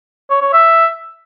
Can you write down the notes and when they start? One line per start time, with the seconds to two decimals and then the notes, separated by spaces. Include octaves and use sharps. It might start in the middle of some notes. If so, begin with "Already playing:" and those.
0.30 C#5
0.42 C#5
0.53 E5